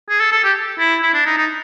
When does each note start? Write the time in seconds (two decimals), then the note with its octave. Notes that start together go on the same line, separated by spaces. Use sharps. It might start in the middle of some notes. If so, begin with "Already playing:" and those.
0.09 G#4
0.20 A4
0.32 A4
0.44 G4
0.79 E4
1.03 E4
1.14 D4
1.26 D#4
1.38 D#4